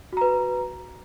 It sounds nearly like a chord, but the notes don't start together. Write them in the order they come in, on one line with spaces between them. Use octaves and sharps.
F#4 A#5 B4